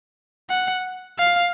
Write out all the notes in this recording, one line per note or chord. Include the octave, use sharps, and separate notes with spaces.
F#5
F5